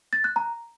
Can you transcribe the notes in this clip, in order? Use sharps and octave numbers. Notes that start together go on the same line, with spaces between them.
A6
F#6
A#5